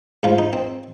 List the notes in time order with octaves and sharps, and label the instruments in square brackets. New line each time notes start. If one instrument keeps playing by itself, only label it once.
[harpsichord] G#2 F3 F4
D#4
C4